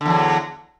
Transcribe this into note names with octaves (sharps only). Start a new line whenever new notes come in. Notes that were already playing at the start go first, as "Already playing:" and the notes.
E2 D3 F#3